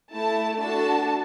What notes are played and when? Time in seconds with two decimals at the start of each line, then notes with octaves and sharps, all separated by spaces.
0.12 A3 E4 A4 A5
0.59 D4 F#4 A4 A5